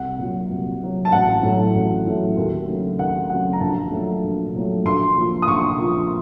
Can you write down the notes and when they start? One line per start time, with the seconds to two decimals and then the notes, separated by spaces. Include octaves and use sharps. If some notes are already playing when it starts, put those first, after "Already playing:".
Already playing: C2 F#5
0.19 A#2 F#3
0.50 C2
0.81 A#2 F#3
1.05 A5
1.12 A1 F#5
1.43 A2 F#3 A3
1.75 A1
2.06 A2 F#3 A3
2.37 D#2
2.68 C#3 F#3 A3
2.99 D#2 F#5
3.29 C#3 F#3 A3 F#5
3.53 A#5
3.60 A#1 A5
3.91 A#2 F#3 A3
4.23 A#1
4.55 A#2 F#3 A3
4.85 A#1 C6
5.17 A#2 F3
5.42 D#6
5.47 A#1 C#6
5.78 A#2 F3